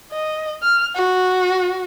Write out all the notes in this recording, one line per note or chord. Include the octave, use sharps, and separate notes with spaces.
D#5
F6
F#4